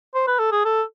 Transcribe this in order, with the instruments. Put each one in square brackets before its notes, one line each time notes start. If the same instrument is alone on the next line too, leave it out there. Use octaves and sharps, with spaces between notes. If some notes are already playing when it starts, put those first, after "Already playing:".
[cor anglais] C5
B4
A4
G#4
A4